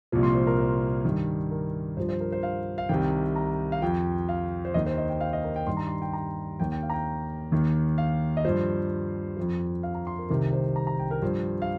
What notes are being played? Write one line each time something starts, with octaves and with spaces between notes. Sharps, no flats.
C2 A#2 F3
C6
C5
A#4
C5
G2 D#3
A#4
G2 F3 C5
C5
A#4
C5
F5
F5
C2 C3 D#3 G5
A#5
F5
F2 F3 G5
F5
C5
D#2 D#3 D#5
C5
D#5
G5
F5
D#5
A#4
G5
G2 D#3 C6
A#5
C6
G5
A#5
D#2 D#3 G5
G5
F5
A#5
G5
D#2 D#3
F5
D#5
G2 F3 C5
F2 F3
F5
A#5
C6
A#4
C2 C3 D#3 A#4
C5
A#5
A#5
G5
A#4
G2 F3 C5
F5